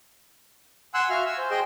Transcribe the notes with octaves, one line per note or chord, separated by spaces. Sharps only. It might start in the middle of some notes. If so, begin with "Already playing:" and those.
F#5 G#5 C6 E6 F#6
F#4 E5 F5 F6
G#5 E6
C5
G#4 C5 D#5 G5 C6